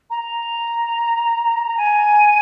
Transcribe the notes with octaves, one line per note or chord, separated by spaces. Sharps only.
A#5
A#5
G#5